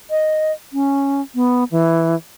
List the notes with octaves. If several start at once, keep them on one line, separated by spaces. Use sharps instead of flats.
D#5
C#4
B3
E3